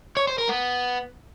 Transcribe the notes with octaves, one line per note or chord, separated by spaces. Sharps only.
C#5
C5
A#4
B3